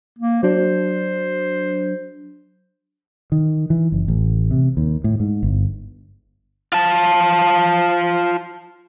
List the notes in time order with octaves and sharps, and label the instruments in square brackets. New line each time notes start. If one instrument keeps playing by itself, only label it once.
[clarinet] A#3
[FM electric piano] F#3 D4 [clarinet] C5
[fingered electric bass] D#3
E3
F#1
A1
C3
D#2
A2
G#2
G1
[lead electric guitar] F4 A5